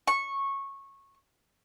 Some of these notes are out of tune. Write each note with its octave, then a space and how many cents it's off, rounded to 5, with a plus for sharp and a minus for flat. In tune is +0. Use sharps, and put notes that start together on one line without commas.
C#6 -15